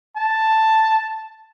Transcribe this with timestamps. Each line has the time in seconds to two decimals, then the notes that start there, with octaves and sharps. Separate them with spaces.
0.17 A5